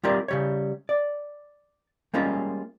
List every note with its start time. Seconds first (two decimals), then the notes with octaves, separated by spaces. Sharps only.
0.04 G3 C4 F4 G4 A#4 D5
0.28 C#3 G3 C#5
0.89 D5
2.14 G3 G#3 A#3 C#4 F4